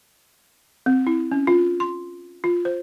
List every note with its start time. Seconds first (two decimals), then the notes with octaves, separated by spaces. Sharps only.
0.86 C4
1.07 E4
1.32 C#4
1.47 F4
1.80 C6
2.44 F4
2.65 C5